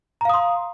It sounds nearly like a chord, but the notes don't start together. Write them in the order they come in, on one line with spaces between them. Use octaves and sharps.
A#5 F5 D#6 C6